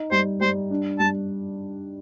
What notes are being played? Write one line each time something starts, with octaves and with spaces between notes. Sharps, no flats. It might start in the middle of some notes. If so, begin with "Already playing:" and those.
Already playing: D#4
G3 C5
G3 C5
D4
G3 A5